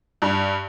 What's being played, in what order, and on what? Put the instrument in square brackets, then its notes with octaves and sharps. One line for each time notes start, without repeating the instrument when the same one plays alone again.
[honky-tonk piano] G2